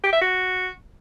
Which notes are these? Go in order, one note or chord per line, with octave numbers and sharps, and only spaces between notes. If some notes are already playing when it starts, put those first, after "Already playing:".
G4
E5
F#4